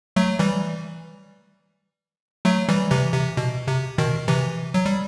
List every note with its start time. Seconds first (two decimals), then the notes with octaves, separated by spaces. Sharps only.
0.16 F#3 A3
0.39 E3 G3
2.45 F#3 A3
2.69 E3 G3
2.91 C3 E3
3.14 C3
3.37 B2
3.68 C3
3.98 B2 D#3
4.28 C3 E3
4.74 F#3
4.86 G3